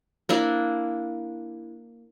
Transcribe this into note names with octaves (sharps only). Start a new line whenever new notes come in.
A#3 D4 E4